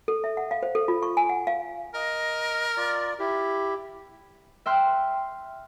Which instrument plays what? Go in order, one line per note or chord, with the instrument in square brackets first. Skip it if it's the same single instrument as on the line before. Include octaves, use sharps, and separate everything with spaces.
[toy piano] A4
E5
F#5
F5
C5
A4
F4
C#6
G#5
F#5
F5
[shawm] A#4 [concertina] D#5
[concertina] F4 D5
E4 G4
[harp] E5 G5 C6 F6 F#6